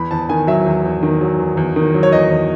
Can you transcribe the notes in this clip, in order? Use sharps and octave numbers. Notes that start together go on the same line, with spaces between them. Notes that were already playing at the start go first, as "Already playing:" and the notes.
Already playing: E2 B5
E2 A5
D#3 G#5
F#3 E5
E2
E2
D#3
F#3
E2
E2
D#3
F#3
C#5
E2 D#5
E2